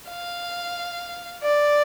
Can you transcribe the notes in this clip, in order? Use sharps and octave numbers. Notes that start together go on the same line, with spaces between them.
F5
D5